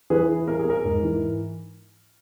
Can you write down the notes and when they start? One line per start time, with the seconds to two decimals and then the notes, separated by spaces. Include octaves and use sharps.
0.10 E3 G#4 B4
0.29 E4
0.47 A#3 A#4
0.59 G#4
0.65 A#3 A#4
0.85 G#2
1.03 E3